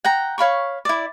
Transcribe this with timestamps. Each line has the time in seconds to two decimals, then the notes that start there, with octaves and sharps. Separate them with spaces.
0.04 F#5 G5 A#5
0.38 C#5 F5 B5 C#6
0.85 E4 D5